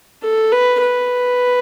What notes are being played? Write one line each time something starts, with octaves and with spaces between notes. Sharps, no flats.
A4
B4
B4